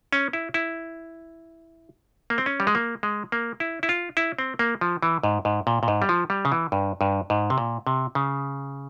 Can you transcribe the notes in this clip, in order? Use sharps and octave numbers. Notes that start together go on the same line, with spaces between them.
C#4
E4
E4
A#3
C4
C#4
G3
G#3
A#3
G#3
A#3
E4
E4
F4
E4
C4
A#3
F3
E3
G#2
G#2
A#2
A#2
G#2
G3
F3
G3
C#3
E3
G2
G2
G#2
C3
A#2
C3
C#3